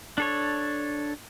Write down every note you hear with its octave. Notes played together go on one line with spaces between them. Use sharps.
D4 A4 C#5